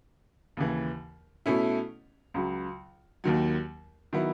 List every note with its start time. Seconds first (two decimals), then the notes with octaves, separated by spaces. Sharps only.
0.57 D#2 C#3 E3
1.46 B2 A3 C#4 E4
2.34 C#2 C#3 F#3
3.24 D#2 D#3 F#3
4.13 D#3 F#3 B3 E4